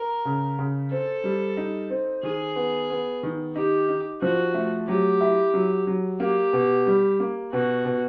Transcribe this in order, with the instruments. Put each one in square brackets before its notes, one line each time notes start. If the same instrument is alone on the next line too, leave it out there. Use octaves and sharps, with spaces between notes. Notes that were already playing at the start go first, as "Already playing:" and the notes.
Already playing: [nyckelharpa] A#4
[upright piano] C#3
C#3
[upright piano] C4 [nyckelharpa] A4
[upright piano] G3
D#4
C4
[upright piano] D#3 [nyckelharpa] G#4
[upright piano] B3
B3
D#3
[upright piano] D#4 [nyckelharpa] G4
[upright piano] D#4
[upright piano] F3 [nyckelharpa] F#4
[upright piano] A3
[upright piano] F#3 [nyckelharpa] G4
[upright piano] E4
F#3
F#3
[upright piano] A#3 [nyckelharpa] G4
[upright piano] B2
G3
A#3
[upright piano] B2 [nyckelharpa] F#4
[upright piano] B2